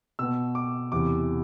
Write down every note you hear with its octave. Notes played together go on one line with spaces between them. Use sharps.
B2 B3 E6
D6
E2 C3 E3 D6